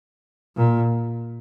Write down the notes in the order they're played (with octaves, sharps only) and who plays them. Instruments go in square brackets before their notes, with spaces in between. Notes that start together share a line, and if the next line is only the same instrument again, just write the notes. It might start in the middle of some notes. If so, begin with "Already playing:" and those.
[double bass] A#2